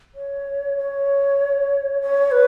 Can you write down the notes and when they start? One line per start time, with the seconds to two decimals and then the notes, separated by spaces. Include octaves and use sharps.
0.15 C#5
0.77 C#5
2.01 C#5
2.32 B4